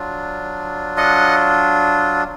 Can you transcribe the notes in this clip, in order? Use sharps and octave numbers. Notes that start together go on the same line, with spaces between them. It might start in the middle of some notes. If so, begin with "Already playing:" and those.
Already playing: F#3 D4 F4
D#5 F#5